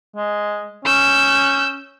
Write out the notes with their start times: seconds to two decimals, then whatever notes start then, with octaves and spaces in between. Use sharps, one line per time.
0.16 G#3
0.85 C#4 E6 G6